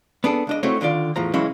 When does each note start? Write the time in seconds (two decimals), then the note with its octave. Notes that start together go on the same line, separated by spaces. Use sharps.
0.24 B3 D4 G#4 A4
0.47 C#2 D4 D#5
0.63 A3 C4 D#4 E4 F#4 C#5
0.81 D3 D#3 F4 D5
1.16 E2 A2 F3 A#5
1.33 C#3 E3 F#3 G#3 C#4 E4